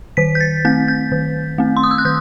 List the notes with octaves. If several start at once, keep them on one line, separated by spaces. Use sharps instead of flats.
D#3 B6
G6
A6
A3 C4 G6
G6
D#3
A3 C4
C6
D#6
E6
F#6
D#3 G6